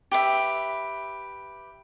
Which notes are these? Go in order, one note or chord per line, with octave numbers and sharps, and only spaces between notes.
G4 B4 E5